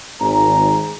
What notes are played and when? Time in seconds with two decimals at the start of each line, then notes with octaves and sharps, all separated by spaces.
0.21 G#1 G#4 A#5